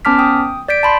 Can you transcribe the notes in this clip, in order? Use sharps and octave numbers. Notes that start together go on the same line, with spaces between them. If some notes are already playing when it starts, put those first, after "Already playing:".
B3 C#4 A5 D6 F6 B6
G5 D#6
D5 G6 B6 D7
A5 B5 C6